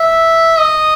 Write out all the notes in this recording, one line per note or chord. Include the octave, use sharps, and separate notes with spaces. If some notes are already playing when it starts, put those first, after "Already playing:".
Already playing: E5
D#5